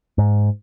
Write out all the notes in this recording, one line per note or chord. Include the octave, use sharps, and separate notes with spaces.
G#2